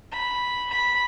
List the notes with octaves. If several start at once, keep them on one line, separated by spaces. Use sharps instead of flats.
B5
B5